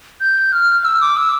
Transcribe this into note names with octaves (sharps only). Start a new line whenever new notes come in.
G6
F6
E6
D6
E6